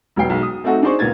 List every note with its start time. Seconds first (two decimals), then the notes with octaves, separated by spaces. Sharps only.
0.16 E1 F#3 B3 G5 C7
0.30 B1 G#3
0.43 D#6
0.64 A3 C4 D#4 F#4 A4
0.83 D4 D#4 G#4 C5 D5 C#6
0.99 C#2 A#2 A#3 B3 G#6 A6